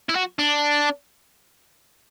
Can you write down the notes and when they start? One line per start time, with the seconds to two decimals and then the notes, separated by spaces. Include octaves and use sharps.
0.09 E4
0.15 F#4
0.39 D4